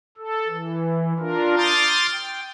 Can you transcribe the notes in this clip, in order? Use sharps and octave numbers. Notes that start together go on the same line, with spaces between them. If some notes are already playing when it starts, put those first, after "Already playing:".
A4
E3
D4 F4 A#4
C6 D6 D#6 F6 G6 A6
G5